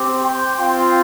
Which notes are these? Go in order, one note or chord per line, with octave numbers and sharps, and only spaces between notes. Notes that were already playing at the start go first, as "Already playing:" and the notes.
Already playing: C4 G4
G5 C6
C4 F4 G5 C6